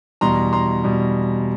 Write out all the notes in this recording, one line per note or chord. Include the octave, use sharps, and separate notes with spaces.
E2 B2 G3 A#5 C6
A#5 C6
B2 G3